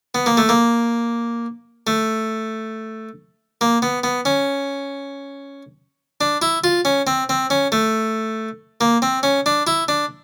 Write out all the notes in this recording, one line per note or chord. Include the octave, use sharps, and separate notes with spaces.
B3
A#3
A3
A#3
A3
A#3
B3
B3
C#4
D4
E4
F4
C#4
C4
C4
C#4
A3
A#3
C4
C#4
D4
E4
D4